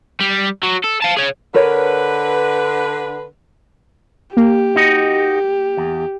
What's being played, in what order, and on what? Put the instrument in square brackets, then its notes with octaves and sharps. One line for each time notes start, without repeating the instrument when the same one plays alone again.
[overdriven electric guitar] G3
F#3
A4
F5 A5
G#4 C#5
[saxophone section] D3 B4 [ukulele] A#4 C#5
[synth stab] A#3 [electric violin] G4
[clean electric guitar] D#4 F#4 D#5
E2